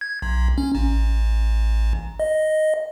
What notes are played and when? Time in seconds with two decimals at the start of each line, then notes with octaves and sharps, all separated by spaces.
0.01 G#6
0.22 B1
0.58 C#4
0.75 A1
2.20 D#5